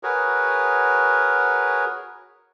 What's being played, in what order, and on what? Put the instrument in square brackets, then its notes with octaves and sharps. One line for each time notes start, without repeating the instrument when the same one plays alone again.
[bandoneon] F#4 G#4 A#4 B4 C#5